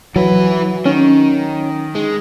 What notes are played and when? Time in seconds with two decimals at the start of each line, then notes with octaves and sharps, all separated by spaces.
0.16 E3 F#3 B4
0.86 D#3 C#4
1.95 G#3